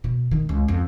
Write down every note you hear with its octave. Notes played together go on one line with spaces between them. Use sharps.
B2
D#3
C#2
F2